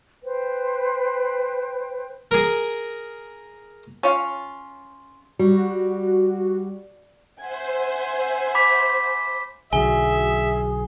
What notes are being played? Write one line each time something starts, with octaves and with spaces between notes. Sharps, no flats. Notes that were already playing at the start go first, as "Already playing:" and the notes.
B4 C5 G5
G#4 A#4
C#4 F4
G3 F#4
C5 E5 F#5 G#5
B5 D6 B6
B1 D3 F#3 G#4 E5 G#5 G7